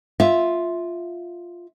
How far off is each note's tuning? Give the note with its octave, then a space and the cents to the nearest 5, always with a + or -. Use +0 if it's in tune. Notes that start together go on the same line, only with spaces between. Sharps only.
F4 +0 E5 -5